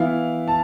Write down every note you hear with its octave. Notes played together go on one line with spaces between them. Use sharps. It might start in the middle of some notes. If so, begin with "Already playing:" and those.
Already playing: E3 B3 E4 F5
A5